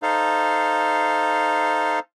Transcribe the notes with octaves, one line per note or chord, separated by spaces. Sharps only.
D#4 A4 C5 F5